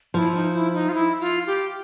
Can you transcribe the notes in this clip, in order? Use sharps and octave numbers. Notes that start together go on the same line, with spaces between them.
F3 E4
D#4
E4
D#4
F4
E4
F4
G4